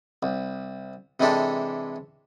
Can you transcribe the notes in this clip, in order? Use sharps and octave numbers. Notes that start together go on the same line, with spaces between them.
C2
C3 E3 G#3 D4 G4 A4